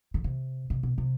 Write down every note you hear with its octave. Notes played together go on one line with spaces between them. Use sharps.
D3
C3
C3
B2
C3